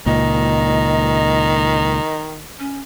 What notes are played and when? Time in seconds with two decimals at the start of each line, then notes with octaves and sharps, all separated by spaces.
0.06 C#2 A#2 D#3 D#5
2.60 C#4